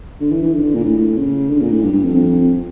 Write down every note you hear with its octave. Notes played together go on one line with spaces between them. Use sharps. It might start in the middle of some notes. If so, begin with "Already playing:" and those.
D3
E3
E3
D3
D3
A#2
A2
C#3
D3
A#2
A2
G2
G2
F2
F2